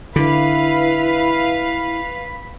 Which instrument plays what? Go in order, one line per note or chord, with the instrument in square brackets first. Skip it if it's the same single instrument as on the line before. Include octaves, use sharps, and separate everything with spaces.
[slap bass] D3 [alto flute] E4 [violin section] B4 F5 [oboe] B5